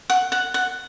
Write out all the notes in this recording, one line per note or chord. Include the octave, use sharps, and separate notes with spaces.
F#5
F#5
F#5